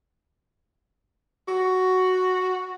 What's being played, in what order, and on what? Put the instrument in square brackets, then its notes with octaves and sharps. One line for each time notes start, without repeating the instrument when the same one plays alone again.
[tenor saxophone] F#4